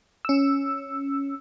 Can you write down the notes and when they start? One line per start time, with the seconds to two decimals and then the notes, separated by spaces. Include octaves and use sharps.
0.25 C#4 E6